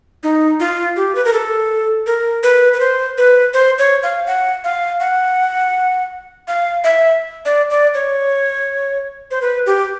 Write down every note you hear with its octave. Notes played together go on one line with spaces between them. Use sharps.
D#4
F4
G4
B4
A#4
A4
A#4
B4
B4
C5
B4
C5
C#5
F5
F#5
F5
F#5
F5
E5
D5
D5
C#5
C5
B4
G4